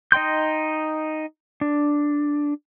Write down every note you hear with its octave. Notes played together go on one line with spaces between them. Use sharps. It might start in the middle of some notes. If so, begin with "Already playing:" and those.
D#4 D#5 G5 C6 G6
D4